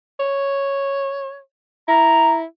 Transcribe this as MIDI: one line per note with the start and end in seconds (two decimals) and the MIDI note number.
0.20 1.39 73
1.88 2.45 64
1.88 2.36 82